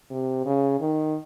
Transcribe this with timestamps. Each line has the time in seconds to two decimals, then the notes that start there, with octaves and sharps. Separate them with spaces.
0.10 C3
0.46 C#3
0.80 D#3